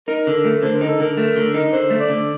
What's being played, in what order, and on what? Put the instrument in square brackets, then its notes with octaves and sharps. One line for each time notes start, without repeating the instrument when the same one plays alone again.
[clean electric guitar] D#4 [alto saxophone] A#4
[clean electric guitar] D3
A3
[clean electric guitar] D3 [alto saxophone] C5
[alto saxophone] A#4
[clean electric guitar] D#4
[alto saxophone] A4
[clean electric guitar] D3 [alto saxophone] A#4
[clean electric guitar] A3
D3
D#4
[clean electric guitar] D3 [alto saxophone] C5
[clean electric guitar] A3
[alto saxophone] D5
[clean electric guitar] D3